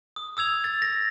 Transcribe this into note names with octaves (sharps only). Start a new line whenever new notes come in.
D#6
D#6 E6 G#6 F7
A6
A#6